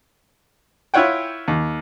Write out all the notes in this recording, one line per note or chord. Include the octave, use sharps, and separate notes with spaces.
E4 F4 C#5 F#5 G5
D#2